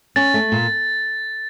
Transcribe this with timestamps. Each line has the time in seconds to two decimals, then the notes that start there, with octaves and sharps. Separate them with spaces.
0.16 C#4 A6
0.34 A3
0.52 A#2